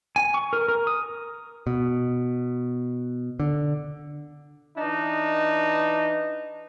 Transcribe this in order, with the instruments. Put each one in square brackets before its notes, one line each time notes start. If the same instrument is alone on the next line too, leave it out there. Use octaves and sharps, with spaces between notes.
[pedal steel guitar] G#5
C#6
A#4
A#4
D#6
[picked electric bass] B2
D3
[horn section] E3 D4 D#4